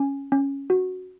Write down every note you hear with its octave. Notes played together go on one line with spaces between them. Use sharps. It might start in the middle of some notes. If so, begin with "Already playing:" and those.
Already playing: C#4 G#5
C#4
F#4